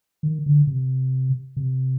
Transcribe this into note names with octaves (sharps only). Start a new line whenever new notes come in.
D#3
D3
C3
C3